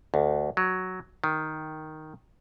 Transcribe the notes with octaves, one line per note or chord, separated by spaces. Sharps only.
D2
F#3
D#3